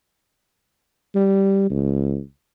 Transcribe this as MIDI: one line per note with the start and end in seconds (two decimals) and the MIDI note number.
1.15 1.70 55
1.70 2.20 37